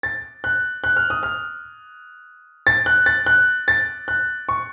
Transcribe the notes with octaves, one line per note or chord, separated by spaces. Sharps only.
A6
F#6
F#6
F6
D#6
F6
A6
F#6
A6
F#6
A6
F#6
C#6